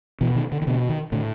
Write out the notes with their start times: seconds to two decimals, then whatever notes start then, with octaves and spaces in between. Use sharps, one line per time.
0.21 B2 E3
0.36 D#3
0.52 D3
0.62 D#3
0.67 B2 D3
0.89 D#3
1.12 A2 D3